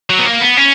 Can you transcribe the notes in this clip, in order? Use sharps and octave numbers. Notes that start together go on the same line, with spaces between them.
F#3
B3
A#3
B3
C#4